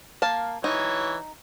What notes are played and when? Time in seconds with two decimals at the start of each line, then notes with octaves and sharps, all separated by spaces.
0.22 A#3 F5 A5
0.64 E3 D#4 C#5